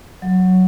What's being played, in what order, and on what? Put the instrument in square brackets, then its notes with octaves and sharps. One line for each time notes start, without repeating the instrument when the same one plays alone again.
[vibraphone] F#3